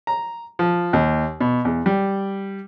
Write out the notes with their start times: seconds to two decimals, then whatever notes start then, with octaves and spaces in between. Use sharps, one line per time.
0.07 A#5
0.59 F3
0.93 D#2
1.40 B2
1.65 E2
1.86 G3